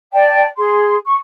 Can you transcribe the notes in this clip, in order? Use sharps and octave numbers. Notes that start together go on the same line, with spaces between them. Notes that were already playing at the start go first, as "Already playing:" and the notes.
D5 G5 A5
G#4 C6
C#6